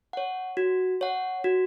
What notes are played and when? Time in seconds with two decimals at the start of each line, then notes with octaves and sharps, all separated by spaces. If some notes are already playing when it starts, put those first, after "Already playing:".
0.13 C#5 F#5
0.57 F#4
1.01 C#5 F#5
1.44 F#4